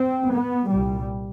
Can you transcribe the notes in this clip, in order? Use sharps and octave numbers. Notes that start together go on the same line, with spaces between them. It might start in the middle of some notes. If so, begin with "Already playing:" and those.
Already playing: C4
B3
C2 A#2 G3